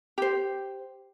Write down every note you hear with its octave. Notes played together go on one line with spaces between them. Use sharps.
G4 C5